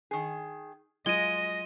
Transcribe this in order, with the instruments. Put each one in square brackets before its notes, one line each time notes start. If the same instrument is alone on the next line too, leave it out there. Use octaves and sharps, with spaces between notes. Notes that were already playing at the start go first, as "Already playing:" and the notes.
[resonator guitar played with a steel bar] D#3 G#4
[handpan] F#3 F4 [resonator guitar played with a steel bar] G#3 [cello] D#5 [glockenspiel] D#7 G7